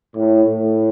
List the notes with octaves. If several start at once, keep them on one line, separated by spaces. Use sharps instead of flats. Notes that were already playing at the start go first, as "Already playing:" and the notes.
A2
A2